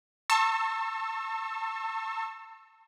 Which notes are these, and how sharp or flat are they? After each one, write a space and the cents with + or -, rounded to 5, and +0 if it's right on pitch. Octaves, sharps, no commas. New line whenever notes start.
A5 +30 C#6 -35 E6 +0